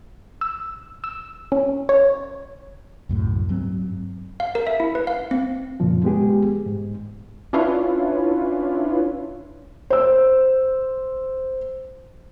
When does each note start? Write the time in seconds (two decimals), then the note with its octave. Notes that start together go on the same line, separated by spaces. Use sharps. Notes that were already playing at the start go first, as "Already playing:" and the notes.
0.41 E6
1.04 E6
1.52 C#4
1.89 C#5
3.09 C2 F#2 A2
3.49 G2 F#3 C4
4.40 F5
4.55 A#4
4.67 E5
4.80 E4
4.95 B4
5.07 F5
5.31 C4
5.80 F#2 A#2 C#3 F3
6.04 G#3 B3 G4 G#4
6.66 G#2
7.53 C#4 D4 E4 F4 B4 C#5
9.90 C5 E6